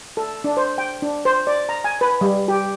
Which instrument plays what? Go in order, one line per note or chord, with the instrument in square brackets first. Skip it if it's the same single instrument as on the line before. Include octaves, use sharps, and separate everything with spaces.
[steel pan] A4
D4
C5
G5
D4
C5
D5
A#5
G#5
B4
G3
G4